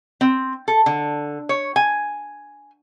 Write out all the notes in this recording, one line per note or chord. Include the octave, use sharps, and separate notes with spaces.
C4
A4
D3
C#5
G#5